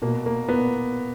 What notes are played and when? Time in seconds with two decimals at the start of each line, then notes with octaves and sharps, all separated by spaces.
0.02 B2 A#3
0.26 A#3
0.49 B3